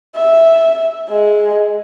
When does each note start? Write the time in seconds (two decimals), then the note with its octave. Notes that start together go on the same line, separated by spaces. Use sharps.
0.16 E5
1.08 G#3